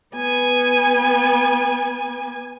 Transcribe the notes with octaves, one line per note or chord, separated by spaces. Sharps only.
B3 G#5